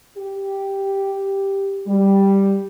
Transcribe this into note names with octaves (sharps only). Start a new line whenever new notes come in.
G4
G3